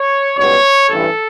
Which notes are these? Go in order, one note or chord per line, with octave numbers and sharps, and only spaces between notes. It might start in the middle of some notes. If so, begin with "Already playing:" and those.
Already playing: C#5
C#2 B2 G3 B3 C#5
A1 G2 E3 A4